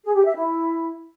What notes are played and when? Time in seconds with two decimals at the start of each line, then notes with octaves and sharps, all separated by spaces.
0.04 G#4
0.14 G4
0.25 E5
0.35 E4